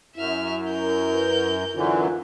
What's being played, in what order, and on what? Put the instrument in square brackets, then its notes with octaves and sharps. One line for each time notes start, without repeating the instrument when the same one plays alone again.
[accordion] F#2 [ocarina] E4 [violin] E5 F6
[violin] A#4 G6
[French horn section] B4
[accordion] F#2 D3 E3 [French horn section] D#4 F4 [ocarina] C5